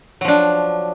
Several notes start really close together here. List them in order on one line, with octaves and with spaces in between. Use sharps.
F#3 F3 D4